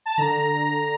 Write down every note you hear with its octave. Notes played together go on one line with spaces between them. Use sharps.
A5
D3 A#5